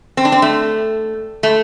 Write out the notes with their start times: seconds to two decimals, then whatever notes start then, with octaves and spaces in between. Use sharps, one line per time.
0.17 C4
0.25 D4
0.32 C4
0.42 A3
1.43 A3